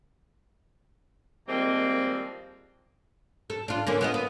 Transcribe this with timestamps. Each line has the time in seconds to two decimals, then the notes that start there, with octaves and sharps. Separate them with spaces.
1.48 D#3 F3 G3 G#3 A#3 C4
3.50 A4
3.68 D4 F4
3.87 D3 A#3 C#4
4.01 B3 F4 D#5
4.14 B3